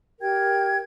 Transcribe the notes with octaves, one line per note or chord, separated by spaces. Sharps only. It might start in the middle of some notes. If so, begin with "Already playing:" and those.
G4 A#4 G5 G#6